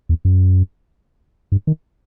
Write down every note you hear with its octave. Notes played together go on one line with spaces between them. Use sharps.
E2
F#2
G2
D#3